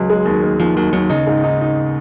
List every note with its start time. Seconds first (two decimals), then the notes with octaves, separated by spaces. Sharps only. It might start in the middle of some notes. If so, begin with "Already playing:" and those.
Already playing: C#2 F#3
0.10 G#3
0.25 D#2
0.42 D#2
0.60 D#2 F3
0.76 D#2 F#3
0.93 D#2 F#3
1.09 C#3 D#4
1.27 G#2
1.44 D#4
1.61 D#4